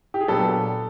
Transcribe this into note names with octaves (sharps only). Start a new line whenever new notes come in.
G4
G#4
A#2 F#3 B3 D4 G4 A4